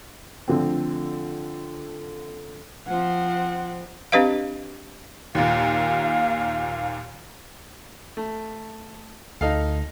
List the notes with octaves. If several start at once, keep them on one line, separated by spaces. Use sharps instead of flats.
D3 F3 A3 C4
F3 C4 F#5
C4 D4 G4 B4 D#5 F5
D#2 A#2 F5
A3
D2 D#4 A4 F5